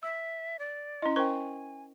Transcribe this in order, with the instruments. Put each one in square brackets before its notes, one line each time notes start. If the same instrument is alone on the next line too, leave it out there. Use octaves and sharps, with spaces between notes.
[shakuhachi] E5 [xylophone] E6
[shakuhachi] D5
[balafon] C#4 E4 [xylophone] D#5 C6
[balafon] C#4 A#4 C5 [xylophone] G5 C#6 [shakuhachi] G#5